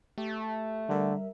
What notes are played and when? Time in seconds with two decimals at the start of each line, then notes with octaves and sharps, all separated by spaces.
0.18 A3 G4
0.89 D3 G3 A#4 E5